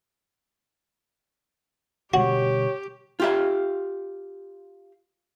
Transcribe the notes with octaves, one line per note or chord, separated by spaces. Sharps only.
B2 D3 G3 F#4 G4 C#5
F4 G4 E5